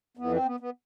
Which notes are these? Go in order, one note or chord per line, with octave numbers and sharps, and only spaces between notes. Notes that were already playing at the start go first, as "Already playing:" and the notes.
F2 E3 B3
C4
B3
B3